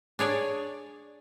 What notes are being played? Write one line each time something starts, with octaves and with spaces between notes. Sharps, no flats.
D4 G#4 C#5 D5